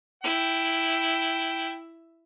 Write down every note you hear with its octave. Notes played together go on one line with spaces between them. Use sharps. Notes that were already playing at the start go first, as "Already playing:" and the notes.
E4 G5